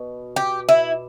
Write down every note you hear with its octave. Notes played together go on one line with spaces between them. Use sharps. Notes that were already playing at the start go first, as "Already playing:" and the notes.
Already playing: B2
G4
E4